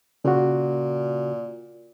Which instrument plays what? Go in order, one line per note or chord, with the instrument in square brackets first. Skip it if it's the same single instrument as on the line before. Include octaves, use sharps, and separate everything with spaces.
[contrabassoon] A#2 [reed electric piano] C#3 F#4